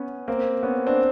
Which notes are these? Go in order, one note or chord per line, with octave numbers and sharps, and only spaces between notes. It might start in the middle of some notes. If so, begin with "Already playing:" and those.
Already playing: B3 C#4
A#3 C4
B3 C#4
C4 D4